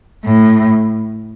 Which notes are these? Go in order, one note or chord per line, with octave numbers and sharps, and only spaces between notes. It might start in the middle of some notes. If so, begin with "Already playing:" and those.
A2